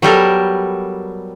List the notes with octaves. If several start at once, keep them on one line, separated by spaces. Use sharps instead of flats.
F#3 G3 B3 G4 A4 A#4